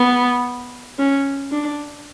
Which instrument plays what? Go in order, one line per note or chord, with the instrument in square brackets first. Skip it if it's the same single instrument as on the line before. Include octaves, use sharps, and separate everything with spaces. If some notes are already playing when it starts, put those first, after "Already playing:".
Already playing: [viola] B3
C#4
D4